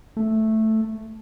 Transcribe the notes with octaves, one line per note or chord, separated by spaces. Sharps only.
A3